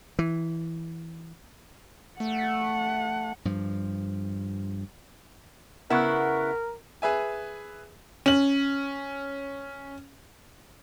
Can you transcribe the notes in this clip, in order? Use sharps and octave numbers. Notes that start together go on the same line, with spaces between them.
E3
A3 F#5
G2 F3
C#3 B3 E4 A#4 F#5 C#6 F#6
G#4 B4 E5 G#5
C#4 F#7